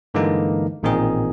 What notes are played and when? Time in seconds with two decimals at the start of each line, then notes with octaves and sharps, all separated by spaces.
0.14 G2 D3 E3 G#3 A#3 D#4
0.83 A1 A#2 D#3 C4 D#4 G#4